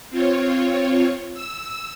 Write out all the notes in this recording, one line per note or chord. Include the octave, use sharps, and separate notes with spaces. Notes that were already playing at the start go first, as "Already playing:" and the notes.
C4 F4 C#5
E6